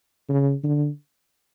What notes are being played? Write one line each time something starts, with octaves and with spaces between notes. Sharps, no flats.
C#3
D3